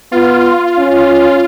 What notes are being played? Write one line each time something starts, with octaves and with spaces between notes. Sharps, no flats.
B3 F4
C#4